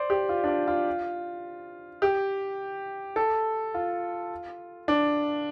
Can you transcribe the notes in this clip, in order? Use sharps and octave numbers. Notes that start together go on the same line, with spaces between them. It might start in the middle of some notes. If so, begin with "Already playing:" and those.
Already playing: C5 D5
G4
F4
D4
F4
F4
G4
A4
F4
D4